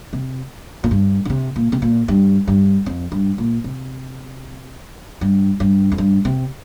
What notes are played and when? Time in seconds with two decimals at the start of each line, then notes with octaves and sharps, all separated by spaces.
0.13 C3
0.84 A#2
0.91 G2
1.25 D3
1.30 C3
1.56 A#2
1.72 C3
1.82 A#2
2.08 G2
2.48 G2
2.86 F2
3.12 G2
3.38 A#2
3.64 C3
5.21 G2
5.60 G2
5.92 F2
5.98 G2
6.25 C3